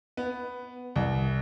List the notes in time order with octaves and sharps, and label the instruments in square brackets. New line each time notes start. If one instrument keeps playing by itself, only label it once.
[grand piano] B3
C2